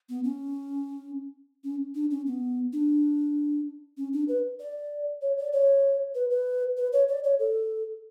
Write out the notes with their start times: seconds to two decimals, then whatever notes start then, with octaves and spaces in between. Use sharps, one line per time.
0.09 B3
0.24 C#4
1.64 C#4
1.95 D4
2.11 C#4
2.26 B3
2.73 D4
3.97 C#4
4.13 D4
4.28 B4
4.60 D5
5.22 C#5
5.38 D5
5.53 C#5
6.15 B4
6.30 B4
6.77 B4
6.93 C#5
7.08 D5
7.24 C#5
7.39 A4